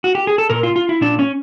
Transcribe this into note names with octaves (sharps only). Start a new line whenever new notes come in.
F#4
G4
G#4
A4
A#2 A#4
F4
F4
E4
A#2 D4
C#4